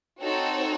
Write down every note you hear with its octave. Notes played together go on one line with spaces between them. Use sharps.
C4 D#4 F#4 A4 C#5